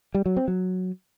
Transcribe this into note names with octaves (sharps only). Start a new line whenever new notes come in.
G3
F#3
C4
F#3